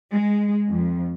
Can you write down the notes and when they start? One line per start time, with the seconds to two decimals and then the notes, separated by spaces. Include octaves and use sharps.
0.12 G#3
0.69 F2